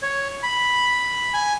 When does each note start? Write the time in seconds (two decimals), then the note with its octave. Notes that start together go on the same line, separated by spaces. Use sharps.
0.02 C#5
0.43 B5
1.34 G#5